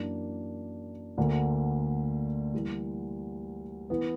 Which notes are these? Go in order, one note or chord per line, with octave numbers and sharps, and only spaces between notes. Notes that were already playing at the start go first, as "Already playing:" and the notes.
Already playing: F#2 E3 A#3 D4
D2 D3 A#3
E3 G3 A#3
E3 B3